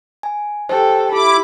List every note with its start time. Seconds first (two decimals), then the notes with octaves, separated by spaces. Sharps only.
0.23 G#5
0.69 G4 A4 C5 G5
1.12 E4 G4 B5 D6